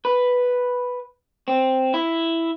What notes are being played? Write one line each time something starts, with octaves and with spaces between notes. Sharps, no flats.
B4
C4
E4